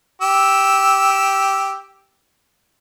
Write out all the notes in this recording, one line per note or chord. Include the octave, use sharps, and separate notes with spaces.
G4 E6